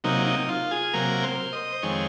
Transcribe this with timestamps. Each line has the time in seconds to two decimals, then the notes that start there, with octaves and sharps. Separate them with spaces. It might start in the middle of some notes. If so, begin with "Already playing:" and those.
0.04 C3 F#3 A#3 D#4
0.26 D#4
0.49 F4
0.71 G#4
0.93 C3 F#3 A#3 A#4
1.23 C5
1.53 D#5
1.72 C5
1.82 F2 D#3 G#3 C4 C#5